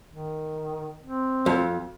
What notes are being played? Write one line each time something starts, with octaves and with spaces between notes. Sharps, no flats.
D#3
C4
F2